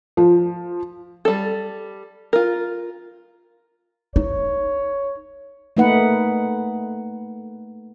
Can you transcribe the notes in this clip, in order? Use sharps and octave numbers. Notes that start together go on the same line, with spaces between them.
F3
G3 A4
F4 A#4
D#4 C#5
A3 A#3 D#4 B4 F#5